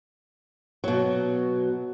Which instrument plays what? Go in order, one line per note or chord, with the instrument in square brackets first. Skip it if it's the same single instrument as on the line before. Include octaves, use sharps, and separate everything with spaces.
[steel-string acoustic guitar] B2 F#3